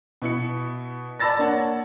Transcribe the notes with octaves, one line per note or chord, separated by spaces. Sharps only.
B2 E4 C#7
D5 A5 B5 E6 A6 A#6
A#3 D4 C#5 F#5